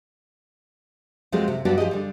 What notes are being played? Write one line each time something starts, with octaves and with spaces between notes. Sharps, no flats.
F3 F#3 G#3 A3 C4 G4
C3
G2 F#3 B3 D4 F#4 G4
F3 G4 G#4 D#5
D3 G3